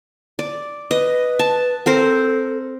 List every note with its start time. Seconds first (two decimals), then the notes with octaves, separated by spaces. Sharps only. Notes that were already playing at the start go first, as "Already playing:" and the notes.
0.39 D5
0.91 B4 D#5
1.39 A5
1.86 C4 A4 A#4 C5